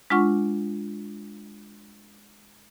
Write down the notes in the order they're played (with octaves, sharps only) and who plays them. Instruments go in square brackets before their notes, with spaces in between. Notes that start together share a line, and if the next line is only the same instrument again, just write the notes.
[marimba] G#3 D4 F4 F#5 C#6